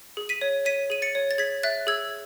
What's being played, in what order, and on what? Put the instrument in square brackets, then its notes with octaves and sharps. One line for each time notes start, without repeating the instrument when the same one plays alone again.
[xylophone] G#4
B6 D#7
C#5
C#5 B6 D#7
G#4 D#7
A6 C#7
C#5
A6
G#4 G#6 B6
E5 F#6 A6
G#4 E6 G#6